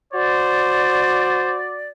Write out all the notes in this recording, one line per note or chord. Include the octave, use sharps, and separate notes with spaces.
F#4 C5 D5